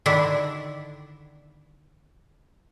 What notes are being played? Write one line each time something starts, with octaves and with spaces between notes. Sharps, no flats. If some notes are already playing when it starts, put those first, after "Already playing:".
D3 D#3 D4 E4